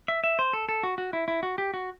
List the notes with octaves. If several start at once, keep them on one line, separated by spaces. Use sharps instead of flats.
E5
E5
C5
A4
A4
F#4
F#4
E4
E4
F#4
G4
F#4